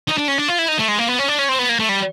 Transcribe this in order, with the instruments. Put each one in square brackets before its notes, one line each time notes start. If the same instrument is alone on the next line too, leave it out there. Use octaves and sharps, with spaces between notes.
[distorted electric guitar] D#4
D4
C#4
D4
F4
E4
D#4
A3
G#3
A#3
B3
C#4
D4
C#4
C4
B3
A#3
A3
G3